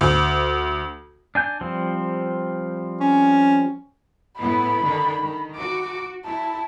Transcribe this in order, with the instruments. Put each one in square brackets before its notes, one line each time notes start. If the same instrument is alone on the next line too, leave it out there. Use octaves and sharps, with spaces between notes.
[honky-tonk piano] D2
[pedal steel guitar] D4 G#5 G6
F3 G3 C4
[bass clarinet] C#4
[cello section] A2 B3 E4 [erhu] B5
[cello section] D3 D#3 D4
D#3
[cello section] F#4 [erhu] D6
[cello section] E4 [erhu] A5